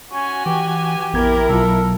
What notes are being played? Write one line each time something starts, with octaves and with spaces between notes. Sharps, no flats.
C#4 F#4 G#5
E3 G4
A#1 F2 B3 E4 A#4 G#6
B1 B2 F#3 F4 A4